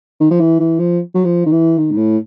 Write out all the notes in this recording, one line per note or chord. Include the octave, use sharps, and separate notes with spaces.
D#3
F3
E3
E3
F3
F#3
F3
D#3
E3
D#3
G#2
A2